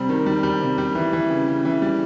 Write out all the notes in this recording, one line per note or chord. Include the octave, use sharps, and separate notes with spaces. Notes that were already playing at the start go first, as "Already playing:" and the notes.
Already playing: C3 G3 C4
D#3
G3
G3
C3
G3
E3
E3
C#3
C#3
E3
G3